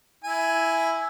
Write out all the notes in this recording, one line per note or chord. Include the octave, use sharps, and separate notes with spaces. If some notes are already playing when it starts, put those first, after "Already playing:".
E4 G#5